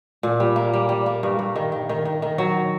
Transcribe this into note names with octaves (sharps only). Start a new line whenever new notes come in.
A#2
G3
A#3
G3
G3
A#3
G2
G2
D#3
D#3
D#3
D#3
D#3
F#3